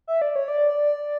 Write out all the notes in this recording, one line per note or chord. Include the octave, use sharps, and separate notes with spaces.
E5
D5
C#5
D5